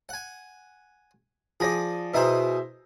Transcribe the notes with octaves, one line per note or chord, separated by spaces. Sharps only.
F#5 G#5
F3 G#4 D5 A#6
B2 D#4 E4 G#4 C5